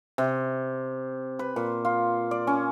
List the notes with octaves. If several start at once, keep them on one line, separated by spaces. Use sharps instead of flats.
C3
B4
A#2
F4
D5
C#4